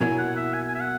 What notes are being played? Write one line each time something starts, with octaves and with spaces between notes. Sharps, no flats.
B2 F#3 A#3 E4 G#5
F#5
E5
G#5
G#5
E5
F#5